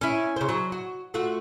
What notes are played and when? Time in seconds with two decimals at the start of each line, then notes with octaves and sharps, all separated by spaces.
0.01 C#4 E4
0.36 C#3 C5
0.49 F#3
0.72 F#4
1.14 A3 F4 F#4